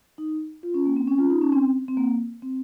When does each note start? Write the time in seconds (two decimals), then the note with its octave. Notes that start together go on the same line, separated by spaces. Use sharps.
0.18 D#4
0.63 F4
0.74 C#4
0.86 A#3
0.96 C4
1.08 C#4
1.18 F4
1.30 D#4
1.41 C#4
1.52 C4
1.88 C4
1.97 A#3
2.42 C4